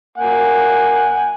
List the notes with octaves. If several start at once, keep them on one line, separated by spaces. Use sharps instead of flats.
A#3 F#5 G#5